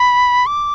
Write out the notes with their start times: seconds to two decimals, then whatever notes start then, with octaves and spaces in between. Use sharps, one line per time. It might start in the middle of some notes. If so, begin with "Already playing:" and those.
Already playing: B5
0.46 D6